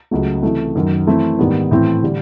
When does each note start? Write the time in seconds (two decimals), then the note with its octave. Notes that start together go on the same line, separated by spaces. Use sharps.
0.11 C#2 C#3 F#3 A3
0.43 C3 E3 A3
0.75 F#2 D#3 F#3
1.07 E3 A3 C4 E4 A4
1.39 G#2 D#3 G3 B3
1.71 A2 E3 A3 C4
2.03 D3 G3